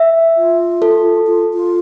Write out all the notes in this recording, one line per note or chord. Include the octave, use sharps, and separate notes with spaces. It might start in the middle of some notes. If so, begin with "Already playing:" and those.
Already playing: E5
F4
A4
F4
F4